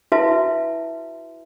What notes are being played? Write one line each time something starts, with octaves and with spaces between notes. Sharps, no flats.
E4 F#4 B4 E5 A5